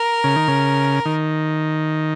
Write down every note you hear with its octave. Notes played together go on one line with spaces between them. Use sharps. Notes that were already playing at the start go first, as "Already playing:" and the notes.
Already playing: A#4
C#3
D#3
C#3
D#3